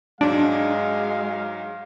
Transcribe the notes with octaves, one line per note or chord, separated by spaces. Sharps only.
G#2 F#3 G#3 D4 F5